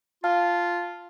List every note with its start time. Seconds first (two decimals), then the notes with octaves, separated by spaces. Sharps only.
0.24 F4 F5 A5 F6